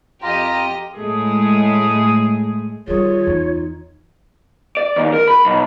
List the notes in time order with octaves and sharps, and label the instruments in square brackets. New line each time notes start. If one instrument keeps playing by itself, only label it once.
[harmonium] F2 A#5 [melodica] F4 [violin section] G4 D#5
[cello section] A2 G#3 A3 G#4
[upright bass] D#3 G3 [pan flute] F4 [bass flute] G#4 [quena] C#5
[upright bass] E2 [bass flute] D#4
[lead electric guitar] D5
D#2
A#4
B5
B1